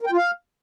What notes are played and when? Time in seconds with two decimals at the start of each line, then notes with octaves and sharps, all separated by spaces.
0.01 A#4
0.07 G5
0.12 F4
0.17 F5